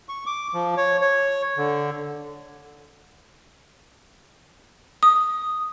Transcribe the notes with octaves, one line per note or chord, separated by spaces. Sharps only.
C#6
D6
F3
C#5
C#5
D3
D#6